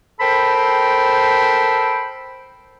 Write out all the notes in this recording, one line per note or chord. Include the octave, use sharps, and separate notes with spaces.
A4 A#4 C5 G5 B5